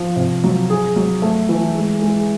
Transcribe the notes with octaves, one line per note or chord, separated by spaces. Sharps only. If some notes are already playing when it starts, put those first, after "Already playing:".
Already playing: F3
C3
F#3
G#4
F#3
A3
E3
G#3
G#3